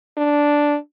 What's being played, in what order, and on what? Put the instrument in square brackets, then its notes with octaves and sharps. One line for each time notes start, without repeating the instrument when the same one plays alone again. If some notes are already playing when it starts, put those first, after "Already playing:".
[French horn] D4